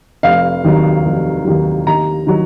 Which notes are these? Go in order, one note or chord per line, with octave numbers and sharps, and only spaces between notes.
F1 F5
D#2 D#3 F#3
F1
D#2 D#3 F#3
D#2 A#5
D#3 F#3